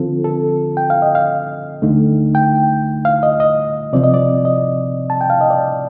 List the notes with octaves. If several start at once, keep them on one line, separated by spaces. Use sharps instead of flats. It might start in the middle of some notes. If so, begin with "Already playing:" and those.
Already playing: D3 F3 C4 F4 A4
A4
G5
F5
D#5
F5
D2 D3 A3 D#4
G5
F5
D#5
D#5
C3 F3 C4 D5
D#5
D5
D#5
A5
G5
F5
D#5
D5